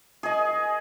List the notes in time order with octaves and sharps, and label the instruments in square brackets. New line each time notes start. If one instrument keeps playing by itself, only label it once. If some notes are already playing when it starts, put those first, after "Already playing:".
[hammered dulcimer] G#4 D#5